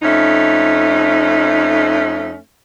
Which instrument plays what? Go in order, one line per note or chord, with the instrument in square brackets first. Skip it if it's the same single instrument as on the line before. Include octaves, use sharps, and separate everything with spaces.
[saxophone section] F2 A3 C#4 D#4